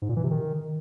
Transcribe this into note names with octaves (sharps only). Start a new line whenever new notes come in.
G#2
A#2
E3
C3
D#3